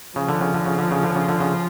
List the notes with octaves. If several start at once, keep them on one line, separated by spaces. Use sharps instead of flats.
C#3 F3
D3
C#3
D3
C#3
D3
C#3
D3
C#3
D3
C#3